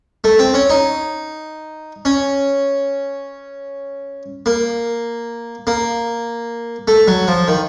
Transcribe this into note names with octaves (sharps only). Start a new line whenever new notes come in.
A3
C4
C#4
D#4
C#4
A#3
A#3
A3
F#3
F3
D#3